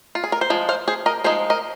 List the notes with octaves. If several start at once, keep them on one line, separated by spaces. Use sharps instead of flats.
F4
G#4
A#4
C5
F3 G#3
C5 F5
G#4 C5
A#4 D#5
F3 G#3 D#4 G#4 C5
A#4 D#5